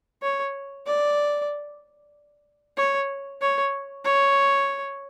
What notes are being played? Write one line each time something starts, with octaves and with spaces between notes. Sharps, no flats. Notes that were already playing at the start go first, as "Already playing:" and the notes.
C#5
D5
C#5
C#5
C#5